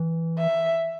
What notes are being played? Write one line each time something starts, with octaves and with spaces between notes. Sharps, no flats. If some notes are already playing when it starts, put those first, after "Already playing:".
Already playing: E3
E5